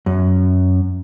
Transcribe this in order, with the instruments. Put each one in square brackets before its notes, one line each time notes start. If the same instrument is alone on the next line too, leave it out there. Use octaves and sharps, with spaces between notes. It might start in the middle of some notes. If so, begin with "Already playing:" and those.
[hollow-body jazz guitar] F#2